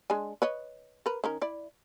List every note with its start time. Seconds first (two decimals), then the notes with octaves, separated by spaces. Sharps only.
0.10 G#3 D4 G#5
0.42 B4 C#5 D#5
1.06 A#4 B4
1.24 D#3 C#4 A#4
1.42 E4 D5